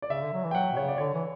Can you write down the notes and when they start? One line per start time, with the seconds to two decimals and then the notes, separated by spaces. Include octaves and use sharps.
0.02 D5
0.10 C#3 E5
0.22 D3
0.33 F#3
0.44 E3
0.51 G5
0.55 F#3 F#5
0.73 B2
0.77 C#3 C#5
0.88 D5
0.98 D3 C#5
1.14 E3